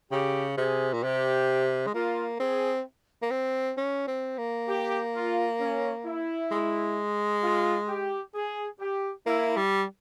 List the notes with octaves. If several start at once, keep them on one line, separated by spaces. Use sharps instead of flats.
C#3 G4
C3 G#4
A#2
C3 G4
G#3
A#3 F4
C4 G#4
A#3
C4
C#4
C4
A#3
G4
F4
C#4
E4
G#3
F4
G4
G#4
G4
A#3 E4
G3